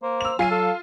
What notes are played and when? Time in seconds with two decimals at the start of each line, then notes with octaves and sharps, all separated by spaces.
0.03 A#3 C5
0.21 E6 F7
0.39 F#3 F4 G#5 C7 D#7
0.51 A4